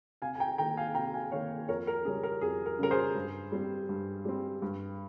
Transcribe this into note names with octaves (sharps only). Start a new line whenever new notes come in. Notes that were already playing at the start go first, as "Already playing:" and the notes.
C3 F5 G#5
G#5
G5 A#5
D#3 A#3 G5 A#5
F5 G#5
C3 G5 A#5
F5 G#5
D#3 A#3 C#5 F5
F2 A#4 C#5
A#4
C#3 G3 C#4 G#4
A#4
F2 G#4
A#4
C#3 G3 C#4 A#4
G#4 C5
G2
G3 C4
G2
G3 C4
G2